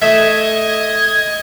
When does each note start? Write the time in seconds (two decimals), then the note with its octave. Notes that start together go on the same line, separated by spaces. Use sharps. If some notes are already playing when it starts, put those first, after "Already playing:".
0.02 A3 D#5 E5 G#6